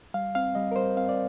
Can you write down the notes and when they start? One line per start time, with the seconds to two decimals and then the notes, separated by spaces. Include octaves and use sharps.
0.14 G3 F5
0.35 C4 F5
0.55 G3 D#5
0.72 A#4
0.76 G3 C5
0.97 C4 F5
1.09 D5